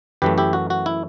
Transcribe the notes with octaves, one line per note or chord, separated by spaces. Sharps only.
F#2 E3 A3 G4 B4
E4 G4
F#4
F#4
E4